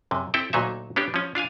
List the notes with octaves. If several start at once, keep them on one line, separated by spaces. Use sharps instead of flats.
F#2 C3
C4 E4 A4 G5 A5
D2 A#2 F#3 D#4 E5
B3 C#4 D4 G4
F3 C#4
D4 F4 F5 G#5